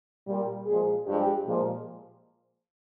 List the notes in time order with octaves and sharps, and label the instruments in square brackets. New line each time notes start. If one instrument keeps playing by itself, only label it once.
[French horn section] A#2 G3
A#2 F3 G#3 G#4
G2 F3 G#3 G4
A#2 F3 G#3